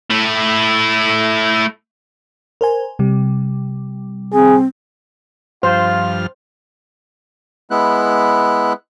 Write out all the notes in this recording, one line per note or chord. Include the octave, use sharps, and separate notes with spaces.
A3 E4
A#4 C5 G#5
C3 G3
C4 G#4
G2 F3 F4 C5 F6
G#3 B3 E4 F#6